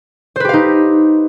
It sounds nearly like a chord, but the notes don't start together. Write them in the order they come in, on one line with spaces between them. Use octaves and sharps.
C5 B4 G4 F5 D#4